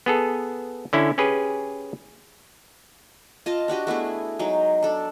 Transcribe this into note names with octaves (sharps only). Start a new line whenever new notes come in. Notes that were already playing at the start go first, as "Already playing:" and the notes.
B3 G#4 A4
D3 C#4 E4
C#4 G4 G#4 B4
F4 D#5 A5
D4 F#4 G4 D#5
A3 B3 E4 G#4
F#3 G#3 D#4
D4 A4